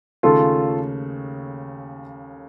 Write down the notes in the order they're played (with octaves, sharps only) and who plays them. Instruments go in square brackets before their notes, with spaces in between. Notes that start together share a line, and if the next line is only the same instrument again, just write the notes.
[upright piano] D#2 C#3 A3 C#4 [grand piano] F4 A4